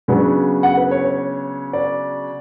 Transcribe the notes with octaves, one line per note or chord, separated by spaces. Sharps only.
C#3 F#3 B3 D4
F#5
B4
C#5
C#5
D5